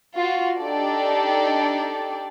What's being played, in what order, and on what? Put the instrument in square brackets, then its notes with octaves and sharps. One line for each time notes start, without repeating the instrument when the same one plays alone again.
[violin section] F4 F#4
D4 D#4 G4 A4 D5